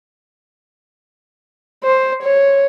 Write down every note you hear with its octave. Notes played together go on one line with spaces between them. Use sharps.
C5
C#5